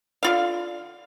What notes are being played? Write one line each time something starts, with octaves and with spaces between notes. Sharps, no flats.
D3 F4 F5